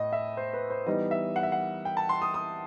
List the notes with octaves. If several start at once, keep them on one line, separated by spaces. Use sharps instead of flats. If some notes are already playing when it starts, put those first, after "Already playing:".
Already playing: A2 D#5
E5
C5
B4
C5
E3 G3 B3 D#4 D#5
E5
F#5
E5
F#5
G5
A5
C6
D#6
D#6